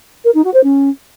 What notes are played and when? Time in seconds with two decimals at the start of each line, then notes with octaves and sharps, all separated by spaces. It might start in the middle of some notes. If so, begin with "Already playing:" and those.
0.24 A#4
0.34 D#4
0.44 F#4
0.53 C5
0.63 C#4